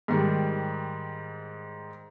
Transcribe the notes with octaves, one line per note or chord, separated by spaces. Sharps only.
G#2 D#3 G3